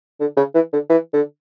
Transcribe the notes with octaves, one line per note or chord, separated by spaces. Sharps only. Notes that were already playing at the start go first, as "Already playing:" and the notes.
D3
C#3
E3
D3
E3
D3